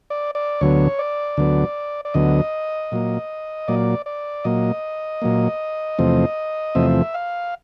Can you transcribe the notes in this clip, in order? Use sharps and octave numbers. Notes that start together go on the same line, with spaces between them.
D5
D5
D2 D3 F#3 B3 C#5
D5
D2 D3 F#3 B3
D5
D2 D3 F#3 B3 D#5
A#2 F#3 A#3
A#2 F#3 A#3 D5
D5
A#2 F#3 A#3 D#5
A#2 F#3 A#3
E2 C3 F3 A3 C4
E2 C3 F3 A3 C4 E5
F5